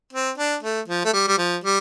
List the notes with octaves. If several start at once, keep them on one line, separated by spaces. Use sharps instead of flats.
C4
D4
A3
F3
A3
G3
G3
F3
G3